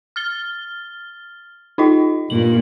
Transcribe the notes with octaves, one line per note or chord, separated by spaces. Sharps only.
F6 A6 G7
D#4 F4 D#5
G2 A#2 F#7